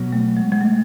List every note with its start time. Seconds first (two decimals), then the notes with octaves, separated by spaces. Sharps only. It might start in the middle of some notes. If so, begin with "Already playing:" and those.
Already playing: B2 F#3 B3
0.13 A3
0.37 G#3
0.52 G#3
0.61 A3